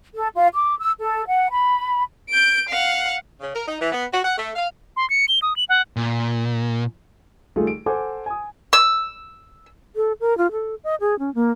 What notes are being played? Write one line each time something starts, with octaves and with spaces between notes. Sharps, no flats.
A4
F4
D6
E6
A4
F#5
B5
G6 D7
F5 F#5
C#3
A#4
D#4
E3
B3
F#4
F#5
A3
F5
C6
C#7
G7
D#6
F#7
F#5
A#2
D#3 G3 A3 F4 G#4
D7
A4 C5 F#5 G#5 D6
G#5 D#6
E6
A4
A#4
F4
A4
D#5
G#4
C#4
A#3